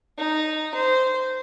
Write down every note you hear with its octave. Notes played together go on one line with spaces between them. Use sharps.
D#4
C5